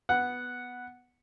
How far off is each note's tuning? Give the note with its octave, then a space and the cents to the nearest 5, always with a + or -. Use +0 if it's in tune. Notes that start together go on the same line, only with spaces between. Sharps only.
B3 +0 F#5 +0